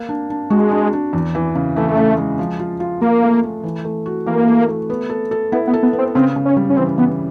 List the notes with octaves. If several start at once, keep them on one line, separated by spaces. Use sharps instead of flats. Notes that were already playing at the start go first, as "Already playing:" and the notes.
Already playing: A#3
D4
D4
G#3 F#4
D4
D4
E2
E3
C#3
E3 A3
C#3
G#3
F3
F4
F4
A#3 F4
A3
A3
E3
A3
F#4
E3 A#3
A3
A3
B3
A4
A4
B3 E4
B3
A4
B3
B3
C4
C#3 C4
C#3
C#4
G3
C#4
E3 C4
E3 B3